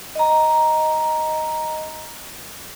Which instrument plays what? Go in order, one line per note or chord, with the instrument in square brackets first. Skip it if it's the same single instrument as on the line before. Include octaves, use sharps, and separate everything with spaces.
[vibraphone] D#5 A#5